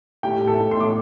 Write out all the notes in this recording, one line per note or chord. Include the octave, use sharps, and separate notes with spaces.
A2 G4 G5
A2
A4 A5
A2
C6
A2 D6